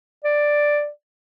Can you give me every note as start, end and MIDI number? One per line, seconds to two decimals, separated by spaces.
0.25 0.89 74